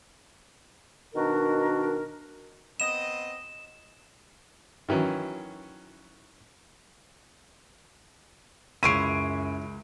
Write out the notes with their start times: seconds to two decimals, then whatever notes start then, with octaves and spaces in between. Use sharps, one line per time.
1.15 B2 D#3 D4 F#4 A#4
2.80 B3 C4 D#5 E7
4.89 D#3 E3 F#3 C#4
8.83 C#2 F#2 G#3 E4 C#5 C6 D7 D#7